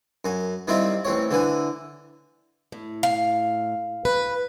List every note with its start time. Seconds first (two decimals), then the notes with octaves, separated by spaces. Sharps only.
0.25 F#2 G#5
0.68 D#3 G3 C4 E4 F4
1.05 A1 C4 C#5
1.31 D3 E3 G#5
2.72 A2
3.03 F5
4.05 B4